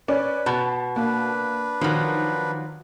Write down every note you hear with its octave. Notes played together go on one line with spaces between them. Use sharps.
C#4 B4 D5
B2 A5
A#3 D4 B4
D#3 F3 F#3